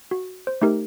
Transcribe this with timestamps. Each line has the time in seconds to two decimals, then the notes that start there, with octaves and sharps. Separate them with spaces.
0.11 F#4
0.47 C5
0.62 A3 D#4 G4 A#4